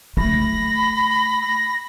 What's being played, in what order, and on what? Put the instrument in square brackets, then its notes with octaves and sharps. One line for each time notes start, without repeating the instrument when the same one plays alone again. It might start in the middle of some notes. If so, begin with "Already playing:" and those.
[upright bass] A3 [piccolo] B5 [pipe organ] A#6